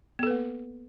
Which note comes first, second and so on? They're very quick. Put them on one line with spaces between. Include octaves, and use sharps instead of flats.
B3 A4 B4 A#3